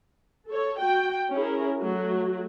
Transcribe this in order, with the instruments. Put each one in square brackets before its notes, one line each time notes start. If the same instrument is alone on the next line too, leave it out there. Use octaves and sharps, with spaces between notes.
[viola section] A4 C#5
F#4 G5
C#4 E4 G#4 A#4
F#3 A3 F#4